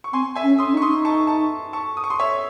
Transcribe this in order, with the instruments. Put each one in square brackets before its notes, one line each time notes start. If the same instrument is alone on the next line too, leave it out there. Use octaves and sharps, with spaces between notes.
[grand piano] C#6
[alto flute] C4 [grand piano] G#5 C6
[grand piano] E5 G#5
[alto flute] C#4
[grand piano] C6 D#6
[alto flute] C#4
[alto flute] D#4 [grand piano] C#6
[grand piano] C6 D#6
A5 C#6
A5 C#6
A5 C#6
D#6
C#6
C6 D#6
C#5 E5